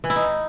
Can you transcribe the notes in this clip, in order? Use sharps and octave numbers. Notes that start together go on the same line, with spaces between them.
E3
E4
D#4